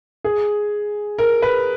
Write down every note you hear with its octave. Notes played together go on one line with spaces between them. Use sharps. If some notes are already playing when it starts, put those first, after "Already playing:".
G#4
A#4
B4